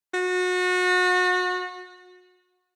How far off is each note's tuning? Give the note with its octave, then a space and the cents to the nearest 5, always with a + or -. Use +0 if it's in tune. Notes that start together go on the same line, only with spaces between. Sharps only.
F#4 -30